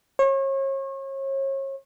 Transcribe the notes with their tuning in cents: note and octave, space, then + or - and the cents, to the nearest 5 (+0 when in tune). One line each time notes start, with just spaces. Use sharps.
C#5 -35